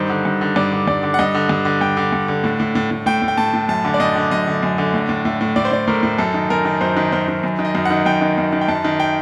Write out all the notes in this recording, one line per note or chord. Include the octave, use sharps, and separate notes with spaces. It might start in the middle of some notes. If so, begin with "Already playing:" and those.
Already playing: G2 D#3 C5
D3
G2
D3
G2 D5
D3
G2 D5
D3
F#5
G2 D#5
D3
G2
D3
G2 G5
D3
G2
D3
A2
A2
A2
A2
A2 G5
A2
G5
A2 A5
A2
F#2 A5
D3
D5
F#2 D#5
D3
F#2 D#5
D3
F#2
D3
A2
A2
A2
A2
A2 D5
C5
A2 D5
A2 A#4
A2
F#2 A4
D#3
F#2 A#4
D#3
F#2 C5
D#3
F#2 C5
D#3
F#2
D#3
D#5
F#2
F#5
D#3
F#2 G5
D#3
F#2
D#3
G5
F#2 A5
D#3
G5